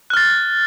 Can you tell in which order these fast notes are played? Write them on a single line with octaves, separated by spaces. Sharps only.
F#6 F6 A6